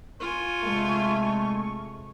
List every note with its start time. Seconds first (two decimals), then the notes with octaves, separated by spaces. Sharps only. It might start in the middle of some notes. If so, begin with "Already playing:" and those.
0.20 F4 G#5 C#6
0.63 C3 G#3 A3